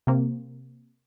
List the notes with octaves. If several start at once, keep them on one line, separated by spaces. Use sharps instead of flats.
C3 A#3 C4